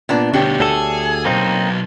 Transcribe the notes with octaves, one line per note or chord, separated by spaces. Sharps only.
A#2 B3 D4
D2 B2 D4 G4 C#5
D2 G#4 A4
B1 F#2 A#3 C4 D#4